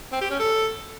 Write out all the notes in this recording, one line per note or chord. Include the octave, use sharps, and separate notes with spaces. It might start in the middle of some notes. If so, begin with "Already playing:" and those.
C4
G4
C#4
A4